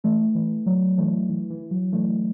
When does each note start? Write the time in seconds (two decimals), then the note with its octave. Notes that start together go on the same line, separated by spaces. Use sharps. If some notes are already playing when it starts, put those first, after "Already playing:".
0.04 E3 A3
0.35 E3
0.66 F#3
0.98 E3 A3
1.29 E3
1.50 E3
1.71 F#3
1.92 E3 A3